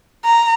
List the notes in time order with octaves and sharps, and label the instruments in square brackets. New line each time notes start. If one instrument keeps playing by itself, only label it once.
[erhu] A#5